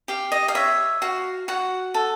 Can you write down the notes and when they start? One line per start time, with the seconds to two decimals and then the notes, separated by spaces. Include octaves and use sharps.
0.08 G4 F5
0.32 D#5
0.48 F5
0.55 C#5 E5
1.02 F#4 F5
1.48 F#4 F#5
1.94 A4